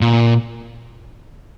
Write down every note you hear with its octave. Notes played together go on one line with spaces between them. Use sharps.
A#2